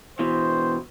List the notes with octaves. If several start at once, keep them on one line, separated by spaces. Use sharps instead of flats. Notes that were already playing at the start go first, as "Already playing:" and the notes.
B2 E3 C5